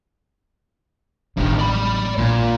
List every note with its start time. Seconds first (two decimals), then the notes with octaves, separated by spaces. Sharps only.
1.37 A1 G2 D#3 B3
1.59 D5 B5
2.18 A#1 E2 A#2